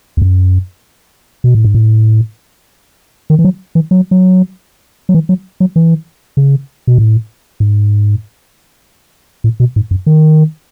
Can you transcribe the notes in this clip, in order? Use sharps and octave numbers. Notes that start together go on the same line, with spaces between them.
E2
F#2
B2
A2
G#2
A2
D#3
E3
F#3
E3
F#3
F#3
F#3
E3
F#3
F#3
E3
C#3
B2
A2
G#2
A2
B2
G#2
F#2
D#3